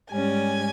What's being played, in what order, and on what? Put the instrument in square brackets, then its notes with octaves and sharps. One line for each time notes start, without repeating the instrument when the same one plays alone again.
[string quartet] G#2 G3 C#4 G#5